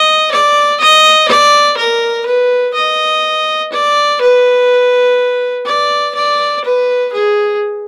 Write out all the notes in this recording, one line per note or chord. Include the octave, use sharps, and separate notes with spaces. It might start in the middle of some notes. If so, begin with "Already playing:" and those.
Already playing: D#5
D5
D#5
D5
A#4
B4
D#5
D5
B4
D5
D5
B4
G#4